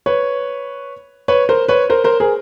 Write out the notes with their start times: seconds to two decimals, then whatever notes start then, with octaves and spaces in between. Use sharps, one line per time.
0.06 B4 C#5
1.28 B4 C#5
1.49 A#4 C5
1.68 B4 C#5
1.90 A#4 C5
2.04 A#4 C5
2.20 G#4 A#4